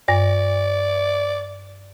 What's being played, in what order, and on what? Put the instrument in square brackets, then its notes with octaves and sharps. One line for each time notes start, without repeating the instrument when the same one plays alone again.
[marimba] G2 [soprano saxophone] D5